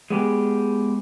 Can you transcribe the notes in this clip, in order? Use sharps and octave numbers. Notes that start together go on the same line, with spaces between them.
G#3 B3 G4 G#4